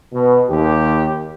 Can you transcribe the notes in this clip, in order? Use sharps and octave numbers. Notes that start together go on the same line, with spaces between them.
B2
D#2 G4